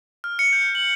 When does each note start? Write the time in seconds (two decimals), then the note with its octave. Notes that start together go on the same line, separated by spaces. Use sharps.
0.24 F6
0.39 C#7
0.53 G6
0.75 F#7